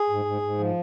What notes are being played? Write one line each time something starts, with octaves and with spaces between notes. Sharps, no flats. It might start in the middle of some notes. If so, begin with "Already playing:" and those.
Already playing: G#4
G#2
G#2
G#2
F3